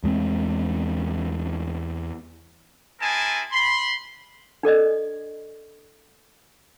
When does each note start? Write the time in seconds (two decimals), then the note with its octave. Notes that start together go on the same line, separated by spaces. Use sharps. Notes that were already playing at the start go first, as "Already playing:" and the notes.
0.04 E2 G#3 C4
3.01 C4 E4 G#4 A#4 G#5 A5
3.52 B5 C6
4.63 D4 A4 D5 D#5